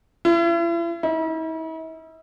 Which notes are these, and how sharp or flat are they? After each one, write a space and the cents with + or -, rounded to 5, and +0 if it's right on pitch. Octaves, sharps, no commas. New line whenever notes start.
E4 +40
E4 -45